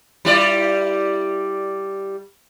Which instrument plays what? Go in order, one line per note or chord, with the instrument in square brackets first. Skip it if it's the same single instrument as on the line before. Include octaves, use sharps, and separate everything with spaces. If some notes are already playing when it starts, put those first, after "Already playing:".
[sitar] G3 E4 D5